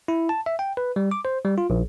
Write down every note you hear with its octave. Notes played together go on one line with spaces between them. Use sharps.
E4
A5
E5
G5
B4
G3
D6
C5
G3
F4
A#1